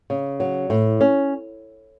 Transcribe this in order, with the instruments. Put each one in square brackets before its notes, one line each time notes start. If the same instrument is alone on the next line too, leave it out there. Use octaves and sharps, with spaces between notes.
[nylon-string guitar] C#3
F#3
A2
C#4